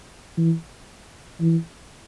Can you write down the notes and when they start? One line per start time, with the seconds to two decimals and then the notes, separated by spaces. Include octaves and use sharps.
0.37 E3
1.41 E3